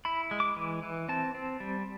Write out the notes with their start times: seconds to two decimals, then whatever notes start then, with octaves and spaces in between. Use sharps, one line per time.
0.05 E4 B5
0.31 G#3
0.40 D6
0.56 E3
0.83 E3
1.09 C4 A5
1.35 C4
1.60 G3